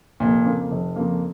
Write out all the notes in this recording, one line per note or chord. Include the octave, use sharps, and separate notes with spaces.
F1 A#2
F2 C#3 F3 A#3
F1
F2 C#3 F3 A#3